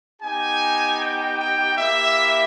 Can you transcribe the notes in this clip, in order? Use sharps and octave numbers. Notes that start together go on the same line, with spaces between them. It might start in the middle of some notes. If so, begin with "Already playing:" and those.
B3 D#4 G4 G#5
G5
G5
A#3 E4 G4 E5